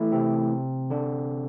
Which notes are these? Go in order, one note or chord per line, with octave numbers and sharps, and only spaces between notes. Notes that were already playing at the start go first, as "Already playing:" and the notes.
Already playing: E3 A3 E4
C3 C4
D3 D4